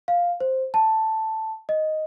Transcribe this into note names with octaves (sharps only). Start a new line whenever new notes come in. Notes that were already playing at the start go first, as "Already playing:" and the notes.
F5
C5
A5
D#5